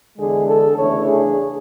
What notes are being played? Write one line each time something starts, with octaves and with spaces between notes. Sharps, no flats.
E2 D3 G#3 G#4
A4
E2 C#3 E3 A3 D4 C#5
G#4